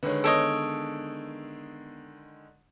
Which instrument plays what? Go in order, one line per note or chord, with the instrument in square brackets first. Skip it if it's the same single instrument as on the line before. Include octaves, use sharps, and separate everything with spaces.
[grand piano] D3 D#3 G#3 [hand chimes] B4 C#5
[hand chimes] B3 D7 [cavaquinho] A4 C#5 D#5